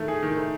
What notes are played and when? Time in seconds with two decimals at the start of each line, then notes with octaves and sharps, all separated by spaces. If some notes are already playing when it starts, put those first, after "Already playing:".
Already playing: D#3 A3
0.08 G#4
0.23 D#3
0.37 A3